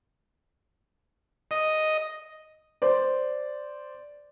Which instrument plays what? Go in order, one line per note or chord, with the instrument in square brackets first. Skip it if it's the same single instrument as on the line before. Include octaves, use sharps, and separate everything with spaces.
[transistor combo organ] D#5
[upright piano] C5 D5